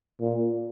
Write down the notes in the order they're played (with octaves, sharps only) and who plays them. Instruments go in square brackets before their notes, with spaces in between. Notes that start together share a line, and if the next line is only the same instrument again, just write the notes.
[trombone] A#2